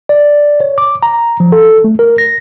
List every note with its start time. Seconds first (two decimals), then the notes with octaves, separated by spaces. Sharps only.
0.09 D5
0.60 C#5
0.78 D6
1.03 A#5
1.40 F3
1.52 A4
1.84 A3
1.99 A#4
2.18 A#6